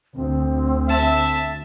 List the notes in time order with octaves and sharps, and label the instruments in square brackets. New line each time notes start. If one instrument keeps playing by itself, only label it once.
[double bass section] D2 [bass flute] C4
[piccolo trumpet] E5 [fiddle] A5